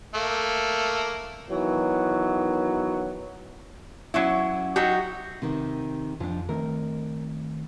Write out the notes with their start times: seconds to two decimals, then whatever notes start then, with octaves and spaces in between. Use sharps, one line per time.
0.15 A3 A#3
1.49 D#3 E3 F#3 B3
4.14 F#3 C#4 E4
4.76 F#3 D#4 F#4 G4
5.42 C3 D#3
6.20 F2 F3 D4
6.49 D#3 A3 C4 A#4